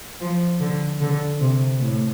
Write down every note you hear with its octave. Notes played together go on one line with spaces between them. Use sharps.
F3
D3
D3
C3
A2